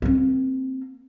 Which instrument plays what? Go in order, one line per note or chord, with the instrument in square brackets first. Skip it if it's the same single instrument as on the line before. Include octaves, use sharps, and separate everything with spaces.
[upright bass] A#3 C4